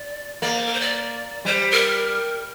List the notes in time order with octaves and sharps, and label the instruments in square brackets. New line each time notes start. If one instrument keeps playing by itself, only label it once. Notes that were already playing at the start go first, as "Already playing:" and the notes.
Already playing: [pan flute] D5
[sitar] A#3 [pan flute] D5
[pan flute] C5
A#4
C5
D5
[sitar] G3 [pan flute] C5
[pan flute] A#4